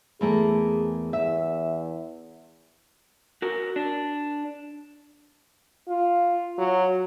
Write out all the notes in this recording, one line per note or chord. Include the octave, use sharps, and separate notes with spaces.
E2 A3 A#3 G#4
E2 E5
F#4 A#4
D4
F4
F#3